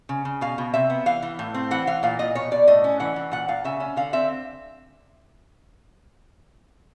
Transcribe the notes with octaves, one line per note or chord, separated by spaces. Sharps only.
C#3
C#3
B2 F5
B2
C3 E5
B3
E3 F5
E3
A2
C4
E3 F#5
E3 F5
A#2 F5
A#2 D#5
B2 C#5
B2 D5
A2 D#5
C#4
E3 F#5
E3
A#2 F#5
A#2 F5
C#3 E5
C#4
D3 F5
C4 E5